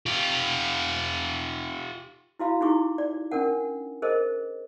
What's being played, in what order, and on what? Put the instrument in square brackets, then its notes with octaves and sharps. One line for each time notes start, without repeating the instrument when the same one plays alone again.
[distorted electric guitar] F4 G4
[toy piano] E4 F#4 F5 B5
D#4 E4 G4 G#4 C#6 D6
D5
C#4 D4 A#4 F#5
G#4 A#4 C5 D#5